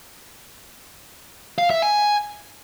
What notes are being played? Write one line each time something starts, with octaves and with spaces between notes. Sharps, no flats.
F5
E5
G#5